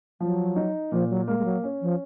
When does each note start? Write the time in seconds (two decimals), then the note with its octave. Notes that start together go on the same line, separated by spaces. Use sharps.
0.20 F3 F#3
0.56 D#4
0.92 A#2 F3
1.10 F#3
1.28 G#3 A#3
1.38 G#3
1.45 F#3
1.63 C#4
1.81 F3